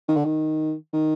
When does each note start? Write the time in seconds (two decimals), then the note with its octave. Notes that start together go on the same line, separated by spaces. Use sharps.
0.08 D#3
0.16 D3
0.25 D#3
0.93 D#3